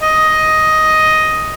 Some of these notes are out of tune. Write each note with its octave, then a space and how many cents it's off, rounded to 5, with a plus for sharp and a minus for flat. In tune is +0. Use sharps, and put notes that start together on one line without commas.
D#5 +5